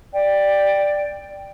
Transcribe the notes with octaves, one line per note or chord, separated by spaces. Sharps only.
D5 G5